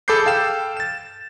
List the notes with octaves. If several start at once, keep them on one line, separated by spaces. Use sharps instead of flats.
G#4 A4 B5 D6 G6 C7
A4 F5 G5 E7
A6 E7